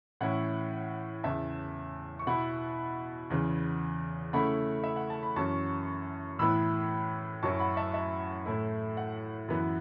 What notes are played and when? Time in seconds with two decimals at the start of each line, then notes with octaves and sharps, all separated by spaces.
0.21 A2 E3 C#4 E4 F#5
1.24 E2 C#3 E3 E5 A5
2.19 C#6
2.27 B2 B3 E4 F#5 B5
3.30 E2 C#3 E3
4.33 C#3 A3 C#4 E4 F#5 B5
4.84 E5
4.96 F#5
5.10 A5
5.23 B5
5.36 F#2 E3 C#4 A5 C#6
6.39 A2 E3 B3 E4 B5 E6
7.43 F#2 F#3 C#4 E4 A5 C#6
7.59 F#5 B5
7.77 E5 A5
7.94 E5 A5
8.46 A2 A3 E4
8.97 F#5
9.48 F#2 E3 B3 E4